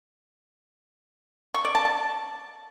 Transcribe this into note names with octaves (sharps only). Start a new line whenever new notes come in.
C#6
D5
A5
A5